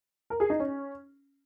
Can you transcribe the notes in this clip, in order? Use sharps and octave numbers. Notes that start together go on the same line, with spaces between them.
A#4
G#4
D#4
C#4